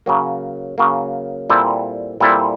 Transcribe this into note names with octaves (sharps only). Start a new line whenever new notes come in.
C#3 F#3 A#3
C#3 F#3 A#3
A#2 G3 C4 E4 A4
A#2 G3 C4 E4 A4